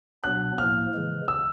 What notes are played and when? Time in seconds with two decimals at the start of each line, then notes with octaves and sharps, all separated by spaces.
0.23 B2 F#3 B3 D4 F#6
0.58 A2 F3 A#3 F6
0.94 C#3 E3 G#3
1.28 E6